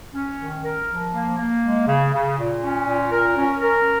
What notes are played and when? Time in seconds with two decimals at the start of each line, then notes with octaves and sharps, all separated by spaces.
0.15 C#4
0.40 D#3
0.64 A#4
0.89 F3
1.14 A#3
1.39 A#3
1.63 G#3
1.88 C#3
2.14 C#3
2.38 A#2
2.62 C#4
2.87 A#2
3.12 A#4
3.37 C#4
3.62 A#4